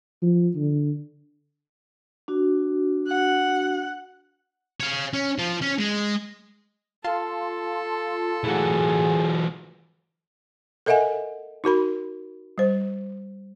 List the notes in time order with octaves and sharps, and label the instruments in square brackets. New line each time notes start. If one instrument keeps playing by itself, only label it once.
[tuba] F3
D3
[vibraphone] D4 F#4
[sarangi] F#5
[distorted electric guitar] C#5 F5
C#4
F3 F4
C#4
G#3
[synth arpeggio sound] F4 A5 C6 [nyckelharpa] A4
[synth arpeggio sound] A2 F#5 [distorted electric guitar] E3 F#3 [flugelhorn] G#4
[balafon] A4 A#4 D#5 E5 F#5 G#5
D#4 F#4 A#4 B5
G3 C5